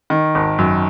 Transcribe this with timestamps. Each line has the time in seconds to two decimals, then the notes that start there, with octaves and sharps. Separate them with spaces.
0.10 D#3
0.35 G#1
0.58 F#2